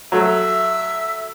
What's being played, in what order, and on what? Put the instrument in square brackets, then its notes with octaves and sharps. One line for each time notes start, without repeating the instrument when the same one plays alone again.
[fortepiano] F#3 A3 [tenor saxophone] E5